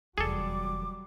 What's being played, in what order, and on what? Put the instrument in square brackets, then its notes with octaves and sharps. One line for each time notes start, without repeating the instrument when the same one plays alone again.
[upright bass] F1 E2 [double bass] F#3 G3 [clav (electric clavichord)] G#4 A4 [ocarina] D6